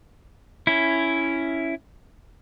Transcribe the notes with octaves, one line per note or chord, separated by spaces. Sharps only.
C#4 E4